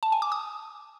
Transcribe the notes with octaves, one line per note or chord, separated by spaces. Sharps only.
A5
G#5
D6
D#6